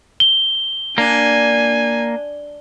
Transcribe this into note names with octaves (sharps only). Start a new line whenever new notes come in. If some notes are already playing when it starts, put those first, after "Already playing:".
G7
A#3 D4 G#5